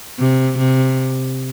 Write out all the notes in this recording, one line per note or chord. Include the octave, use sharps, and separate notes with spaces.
C3
C3